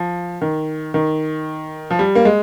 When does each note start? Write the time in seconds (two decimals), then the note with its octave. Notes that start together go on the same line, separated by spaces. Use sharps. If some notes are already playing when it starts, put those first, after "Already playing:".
Already playing: F3
0.41 D#3
0.94 D#3
1.91 F3
1.99 G3
2.15 A#3
2.25 G#3